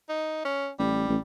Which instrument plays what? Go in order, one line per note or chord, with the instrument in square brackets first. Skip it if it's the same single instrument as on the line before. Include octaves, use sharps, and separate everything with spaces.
[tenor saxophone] D#4
C#4
[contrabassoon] A1 [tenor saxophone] G3
[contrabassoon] A1